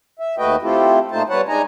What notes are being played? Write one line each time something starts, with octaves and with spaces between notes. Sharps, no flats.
E5
D#2 A3 F#4 B4 D#5 G5
A3 C4 E4 F4 G4 A4
A#2 A3 D#4 F4 C5 A5
G3 B3 B4 C#5 F#5 A5
G#3 D4 D#4 D#5 G#5 A#5